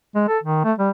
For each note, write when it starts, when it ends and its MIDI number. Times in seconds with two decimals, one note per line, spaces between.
0.15 0.24 56
0.28 0.38 69
0.43 0.64 51
0.64 0.73 57
0.78 0.90 55